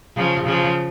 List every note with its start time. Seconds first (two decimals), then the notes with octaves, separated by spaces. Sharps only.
0.16 C#3 F3
0.46 C#3 F3